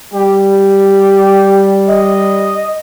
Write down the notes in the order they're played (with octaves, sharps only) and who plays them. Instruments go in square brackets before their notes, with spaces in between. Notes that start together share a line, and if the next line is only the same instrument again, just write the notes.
[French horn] G3 [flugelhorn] G4
[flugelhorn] D#5